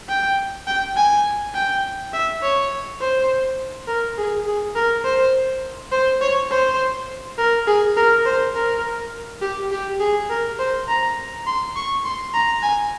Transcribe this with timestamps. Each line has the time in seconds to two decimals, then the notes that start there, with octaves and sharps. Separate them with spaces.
0.09 G5
0.67 G5
0.97 G#5
1.55 G5
2.13 E5
2.42 C#5
3.01 C5
3.88 A#4
4.18 G#4
4.46 G#4
4.76 A#4
5.05 C5
5.92 C5
6.22 C#5
6.51 C5
7.38 A#4
7.67 G#4
7.97 A#4
8.26 C5
8.55 A#4
9.42 G4
9.71 G4
10.00 G#4
10.30 A#4
10.59 C5
10.88 A#5
11.46 C6
11.76 C#6
12.05 C6
12.34 A#5
12.63 G#5